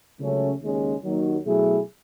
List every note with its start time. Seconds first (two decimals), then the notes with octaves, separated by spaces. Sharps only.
0.19 C#2 C#3 F#3 A3 C#4
0.60 D#2 C#3 G#3 C#4
1.03 D#2 D#3 F#3
1.46 B2 F#3 A3 E4 G#4